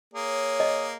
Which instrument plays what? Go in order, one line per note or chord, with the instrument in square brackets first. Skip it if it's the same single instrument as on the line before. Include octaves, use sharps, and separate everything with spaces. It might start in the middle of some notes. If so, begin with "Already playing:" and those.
[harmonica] A#3 G#4 [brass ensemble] C#5
[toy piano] D#5